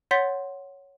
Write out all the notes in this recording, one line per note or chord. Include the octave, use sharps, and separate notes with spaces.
C#5 F#5 C6 G6 A6 B6